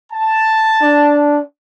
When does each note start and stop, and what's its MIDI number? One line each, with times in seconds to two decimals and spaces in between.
0.12 1.23 81
0.83 1.40 62